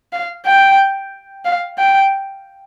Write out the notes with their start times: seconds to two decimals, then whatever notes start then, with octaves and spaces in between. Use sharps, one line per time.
0.13 F5
0.46 G5
1.45 F5
1.78 G5